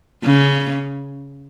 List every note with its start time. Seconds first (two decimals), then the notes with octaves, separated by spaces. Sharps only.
0.24 C#3